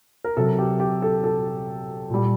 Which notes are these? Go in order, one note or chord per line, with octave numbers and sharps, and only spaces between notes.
A#4
C3 F#3 A4
G4
G4
A4
A4
A#2 G3